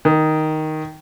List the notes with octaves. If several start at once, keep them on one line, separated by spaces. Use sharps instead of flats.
D#3